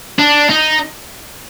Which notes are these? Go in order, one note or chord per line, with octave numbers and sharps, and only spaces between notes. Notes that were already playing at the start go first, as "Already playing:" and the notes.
D4
D#4